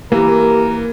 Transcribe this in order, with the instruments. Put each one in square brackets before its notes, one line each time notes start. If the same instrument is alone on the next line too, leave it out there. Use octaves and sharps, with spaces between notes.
[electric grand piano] E3 [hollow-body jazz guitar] A#3 [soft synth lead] G4 [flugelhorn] A#4